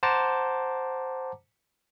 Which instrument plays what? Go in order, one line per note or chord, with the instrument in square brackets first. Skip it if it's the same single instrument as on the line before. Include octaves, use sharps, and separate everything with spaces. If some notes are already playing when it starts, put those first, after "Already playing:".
[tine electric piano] C5 F#5 A5 A#5 D6